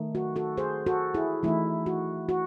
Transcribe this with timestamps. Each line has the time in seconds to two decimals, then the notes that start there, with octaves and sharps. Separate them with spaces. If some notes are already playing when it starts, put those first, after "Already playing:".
Already playing: D#3 A3 D#4
0.15 F#4
0.36 F#4 A4
0.57 G#4 C5
0.86 F#4 A4
1.14 E4 G#4
1.43 E3 A3 D#4 E4
1.86 F#4
2.29 F#4